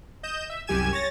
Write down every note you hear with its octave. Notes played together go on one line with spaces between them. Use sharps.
D#5 G6 E7
E5
C2 F#2 G4 G#5 G#6 E7
C#5 A6 A#6